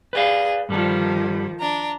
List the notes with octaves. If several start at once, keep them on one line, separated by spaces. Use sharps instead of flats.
G#4 B4 D5 F5
G2 D#3 F3 G3 A4
D4 A#5